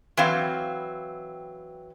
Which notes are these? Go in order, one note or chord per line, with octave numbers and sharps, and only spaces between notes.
E3 F#3 C4 F5